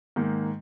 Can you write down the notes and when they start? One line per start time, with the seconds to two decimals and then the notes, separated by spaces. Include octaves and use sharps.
0.16 G#2 D#3 A#3